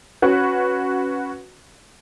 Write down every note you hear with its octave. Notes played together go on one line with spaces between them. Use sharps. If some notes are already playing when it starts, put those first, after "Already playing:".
C#4 F#4 B4